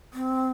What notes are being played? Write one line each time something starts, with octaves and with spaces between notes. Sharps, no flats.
C4